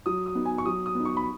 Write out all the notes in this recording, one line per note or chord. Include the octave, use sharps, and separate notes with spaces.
F#3 D#6
D#6
B3 D#4
G#5
C#6
F#3 D#6
D#6
B3
D#4
C#6
B5